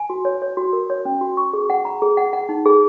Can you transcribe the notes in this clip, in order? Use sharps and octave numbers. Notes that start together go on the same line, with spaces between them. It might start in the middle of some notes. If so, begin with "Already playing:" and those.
Already playing: G#5
F#4
C#5
C#5
F#4
A#4
C#5
C#4
F#4
C#6
G#4
F#5
A#5
G#4
F#5
F#5
D#4
G#4